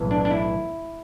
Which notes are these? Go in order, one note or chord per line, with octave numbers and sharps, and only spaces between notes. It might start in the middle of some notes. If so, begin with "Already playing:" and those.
Already playing: B1 A2 E3
D4
D4
E4